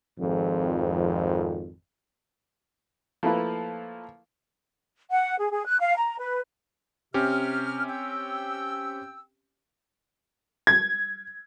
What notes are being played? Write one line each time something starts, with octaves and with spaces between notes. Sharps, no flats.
G#1 F2
F3 A3 A#3 E4 F4 B4
F#5
G#4
G#4
F#6
F5
A#5
B4
C3 C4 C#4 G4 F6
G5 E6
G#6